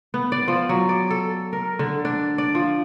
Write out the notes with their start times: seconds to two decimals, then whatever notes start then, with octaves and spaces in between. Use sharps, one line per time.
0.14 B3
0.32 D5
0.48 F3
0.69 F#3
0.89 D5
1.10 A4
1.53 A#4
1.79 D3
2.05 D4
2.38 D5
2.55 F3